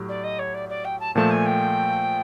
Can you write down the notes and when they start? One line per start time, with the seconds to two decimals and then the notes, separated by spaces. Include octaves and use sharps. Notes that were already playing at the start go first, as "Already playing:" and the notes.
Already playing: A2 F#3 G4
0.09 D5
0.24 D#5
0.39 C#5
0.54 D5
0.69 D5
0.85 G5
1.00 A5
1.15 A#2 F3 A3 A5
1.31 G#5
1.46 G5